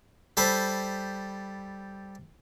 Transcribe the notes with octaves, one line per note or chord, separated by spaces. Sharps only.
G3 A4 C5 B5